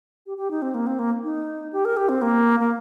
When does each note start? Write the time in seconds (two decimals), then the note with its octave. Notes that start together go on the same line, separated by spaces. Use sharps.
0.26 G4
0.37 G4
0.51 D#4
0.62 C4
0.74 A#3
0.87 C4
0.99 A#3
1.24 D#4
1.73 G4
1.85 A#4
1.97 G4
2.09 C4
2.22 A#3
2.60 A#3